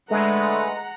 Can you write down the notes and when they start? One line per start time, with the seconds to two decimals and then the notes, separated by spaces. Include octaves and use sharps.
0.11 D3 G#3 A3 B4 F#5 A#5